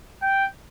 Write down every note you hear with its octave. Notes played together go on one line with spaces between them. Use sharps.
G5